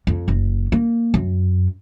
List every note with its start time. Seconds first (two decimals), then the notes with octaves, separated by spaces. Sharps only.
0.07 F2
0.28 F#1
0.72 A#3
1.14 F#2